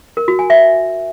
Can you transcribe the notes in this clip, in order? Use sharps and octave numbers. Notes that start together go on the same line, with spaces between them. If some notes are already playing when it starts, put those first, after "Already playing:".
A#4
F#4
G#5
E5